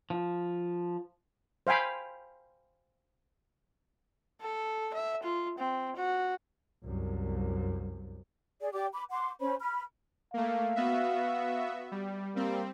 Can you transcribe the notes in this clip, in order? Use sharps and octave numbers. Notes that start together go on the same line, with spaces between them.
F3
C5 F5 G5 G#5 B5
A4
E5
F4
C4
F#4
C2 F#2
G#4 D5
G4 D5 D6
B5 D6
F#5 C6 D6
C#4 C5 C#5 B5
B5 F6
A3 A#3 F5
B3 F#4 E5
G3
G3 A#3 C4